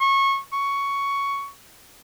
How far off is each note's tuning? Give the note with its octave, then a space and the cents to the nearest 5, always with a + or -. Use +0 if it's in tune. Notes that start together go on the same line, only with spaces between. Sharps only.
C#6 -20
C#6 +10